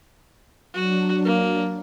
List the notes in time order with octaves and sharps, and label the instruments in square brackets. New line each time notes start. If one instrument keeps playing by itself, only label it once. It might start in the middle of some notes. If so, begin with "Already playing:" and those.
[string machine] F#3 D4 [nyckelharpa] F#4
[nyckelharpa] A#3